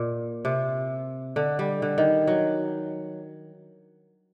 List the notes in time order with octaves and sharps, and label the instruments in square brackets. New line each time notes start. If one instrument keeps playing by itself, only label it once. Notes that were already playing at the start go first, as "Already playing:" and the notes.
Already playing: [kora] A#2
C3
D3
G3
D3
D#3
F#3